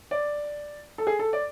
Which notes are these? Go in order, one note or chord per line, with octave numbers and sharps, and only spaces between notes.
D5
A4
G#4
A4
D5